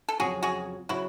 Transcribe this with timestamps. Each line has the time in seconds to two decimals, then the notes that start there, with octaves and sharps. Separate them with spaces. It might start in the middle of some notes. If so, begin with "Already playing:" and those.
0.09 A4
0.20 F2 C#3 F#3 F#4 G#4
0.43 F#4 G#4
0.89 C#3 F#3 E4 F#4